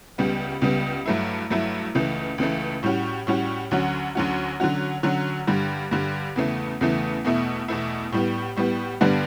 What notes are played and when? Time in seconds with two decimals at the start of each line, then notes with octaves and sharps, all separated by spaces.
0.18 C#2 C#3 G3 B3
0.61 C#2 C#3 G3 B3
1.06 G2 F#3 A3 E4
1.50 G2 F#3 A3 E4
1.95 C#2 C#3 E3 A3
2.38 C#2 C#3 E3 A3
2.83 A2 G3 C#4 F#4
3.27 A2 G3 C#4 F#4
3.71 D2 D3 F#3 C#4 F#4
4.15 D2 D3 F#3 C#4 F#4
4.60 D3 F#3 C#4 F#4
5.03 D3 F#3 C#4 F#4
5.47 G2 D3 G3
5.91 G2 D3 G3
6.36 E2 C#3 E3 A3
6.81 E2 C#3 E3 A3
7.24 E2 B2 A3 E4
7.68 E2 B2 A3 E4
8.12 A2 G3 B3
8.56 A2 G3 B3
9.01 G2 D3 G3 B3 D4